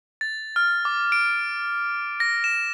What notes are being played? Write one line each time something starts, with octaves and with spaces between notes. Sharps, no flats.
A6
F6
D6
D7
A#6
E7